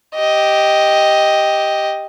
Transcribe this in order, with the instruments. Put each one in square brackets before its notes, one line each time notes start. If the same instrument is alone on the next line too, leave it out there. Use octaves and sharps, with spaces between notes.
[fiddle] G4 D#5